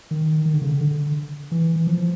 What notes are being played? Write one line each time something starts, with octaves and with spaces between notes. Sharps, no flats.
D#3
D#3
D3
C#3
D3
D3
E3
E3
F3